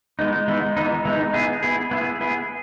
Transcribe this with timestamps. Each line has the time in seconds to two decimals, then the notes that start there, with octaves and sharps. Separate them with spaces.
0.19 E3 G#3 B3 D#4
0.48 E3 G#3 B3 D#4
0.77 E3 G#3 B3 D#4
1.05 E3 G#3 B3 D#4
1.34 B3 E4 G#4
1.63 B3 E4 G#4
1.91 B3 E4 G#4
2.21 B3 E4 G#4